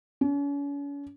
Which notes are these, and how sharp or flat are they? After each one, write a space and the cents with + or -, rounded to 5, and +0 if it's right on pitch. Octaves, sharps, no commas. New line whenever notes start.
C#4 +40